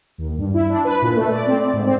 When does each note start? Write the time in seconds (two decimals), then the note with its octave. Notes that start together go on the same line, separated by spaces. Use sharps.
0.18 D#2
0.38 G2
0.54 E4
0.70 D4
0.85 B4
1.02 A#2
1.17 A3
1.31 D5
1.47 C4
1.61 D5
1.73 G#2
1.86 C4